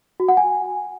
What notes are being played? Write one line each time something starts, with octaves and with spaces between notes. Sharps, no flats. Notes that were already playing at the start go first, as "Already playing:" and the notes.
F#4
F#5
G#5